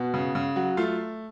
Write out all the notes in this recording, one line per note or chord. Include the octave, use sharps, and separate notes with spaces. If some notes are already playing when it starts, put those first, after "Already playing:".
Already playing: B2 F#4
C#3
C#3
F#3 F#4
A3 F4